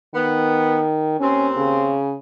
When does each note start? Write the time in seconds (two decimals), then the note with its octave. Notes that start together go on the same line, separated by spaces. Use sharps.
0.14 D#3 B3
1.20 D#2 C4 C#4
1.57 C#3